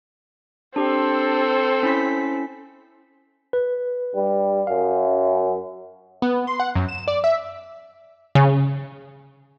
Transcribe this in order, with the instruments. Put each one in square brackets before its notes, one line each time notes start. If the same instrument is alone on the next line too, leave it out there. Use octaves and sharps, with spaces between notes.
[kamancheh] C4 A4 [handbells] D4 G4
[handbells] C#4 E4 B6
[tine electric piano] B4
[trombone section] G2 G3
[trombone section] F#2 [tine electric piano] F5
[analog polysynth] B3
C6
F#5
F#2
E7
D5
E5
[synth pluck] C#3